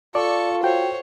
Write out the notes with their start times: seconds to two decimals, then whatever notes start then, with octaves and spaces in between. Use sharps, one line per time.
0.15 F4 A4 D5 A5 C#6
0.63 F#4 C5 C#5 G5